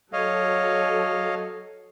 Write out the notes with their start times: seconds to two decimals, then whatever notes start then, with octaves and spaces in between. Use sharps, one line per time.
0.13 F#3 A4 C#5 D#5 F5